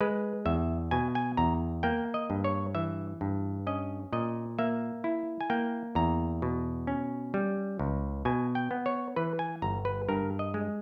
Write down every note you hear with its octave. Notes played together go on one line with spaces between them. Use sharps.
G#3 B4
E2 E5
B2 G#5
G#5
E2 A#5
A#3 G5
D#5
G2
C#5
E3 E5
G2
C#4 D#5
A#2 D#5
A#3 E5
E4
G#5
A#3 G5
E2 A#5
B2
C#4
G3
C#2
B2 G#5
G5
B3
C#5
E3 B4
G#5
G1 A#5
B4
G2 A#4
D#5
G#3